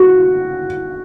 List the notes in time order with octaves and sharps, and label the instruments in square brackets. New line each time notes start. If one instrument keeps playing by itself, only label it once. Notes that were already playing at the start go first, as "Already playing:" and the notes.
Already playing: [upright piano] F#4